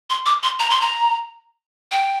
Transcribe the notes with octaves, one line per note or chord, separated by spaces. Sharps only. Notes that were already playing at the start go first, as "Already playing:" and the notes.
C6
D6
C6
A#5
C6
A#5
G5